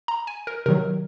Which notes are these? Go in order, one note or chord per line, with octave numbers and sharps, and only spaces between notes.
A#5
G#5
A#4
C3 D#3 F#3 A#4